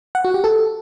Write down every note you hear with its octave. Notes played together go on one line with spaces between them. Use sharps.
F#5
F#4
G4
A4